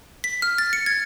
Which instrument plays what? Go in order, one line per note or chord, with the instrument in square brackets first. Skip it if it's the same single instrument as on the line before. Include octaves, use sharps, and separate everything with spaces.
[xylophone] B6
F6
A6
C#7
G#6